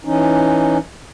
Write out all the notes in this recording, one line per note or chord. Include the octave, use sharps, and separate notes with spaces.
E3 C#4 D#4